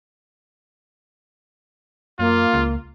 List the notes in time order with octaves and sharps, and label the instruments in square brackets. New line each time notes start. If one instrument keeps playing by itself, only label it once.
[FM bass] F#2 [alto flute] A#3 [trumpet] F4
[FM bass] C#2